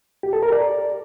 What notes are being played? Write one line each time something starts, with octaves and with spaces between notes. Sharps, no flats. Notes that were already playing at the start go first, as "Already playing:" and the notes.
G4
A4
A#4
D5